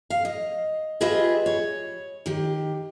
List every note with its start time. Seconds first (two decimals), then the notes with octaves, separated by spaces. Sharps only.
0.10 F5
0.25 D#5
1.01 F4 G4 G#4 B4 D#5 E5
1.46 C#5
2.26 D#3 G4